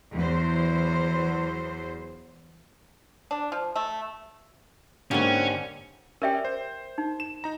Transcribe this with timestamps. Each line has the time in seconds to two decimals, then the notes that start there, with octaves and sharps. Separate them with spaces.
0.14 E2 F#3 C5
3.31 D4
3.52 F3
3.76 A3
5.11 G#2 D3 G3 A#3 C4 C#4
6.22 C#4 G4 A#4 D5 E5 G5
6.45 C5
6.98 D#4
7.20 E7
7.44 D#4 A#5